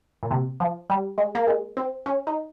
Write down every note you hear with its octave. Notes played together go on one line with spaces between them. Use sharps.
A#2
C3
F3
G3
G#3
A#3
G#3
C4
C#4
D#4